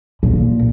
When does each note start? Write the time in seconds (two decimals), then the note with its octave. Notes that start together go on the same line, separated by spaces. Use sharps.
0.23 A#2